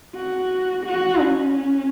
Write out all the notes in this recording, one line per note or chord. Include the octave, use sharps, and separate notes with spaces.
F#4
F#4
C#4